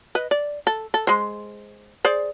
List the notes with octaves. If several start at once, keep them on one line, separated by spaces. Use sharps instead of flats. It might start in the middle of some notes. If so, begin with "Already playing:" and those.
B4 D#5
D5
A4
A4
G#3 C5
G#4 C5 D5